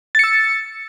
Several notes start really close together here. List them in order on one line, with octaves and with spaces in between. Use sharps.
A6 C#7 E6